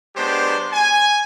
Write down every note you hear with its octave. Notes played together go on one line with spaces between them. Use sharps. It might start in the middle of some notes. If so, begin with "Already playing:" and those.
F#3 G#3 B3 D4 G4 C5
G#5